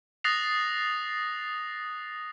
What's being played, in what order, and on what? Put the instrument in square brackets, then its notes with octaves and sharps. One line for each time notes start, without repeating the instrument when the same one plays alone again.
[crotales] D#6 F#6 A6 A#6 C7 F7